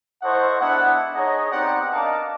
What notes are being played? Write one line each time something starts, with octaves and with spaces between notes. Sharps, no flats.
E4 A4 C5 D#5 F#5 C#6
G#3 B3 D4 E4 F#5
D#4 G#4 C#5 D#5
B3 C4 D#4 G4 D5 F#5
D4 A#4 D#5 F5 A5 D6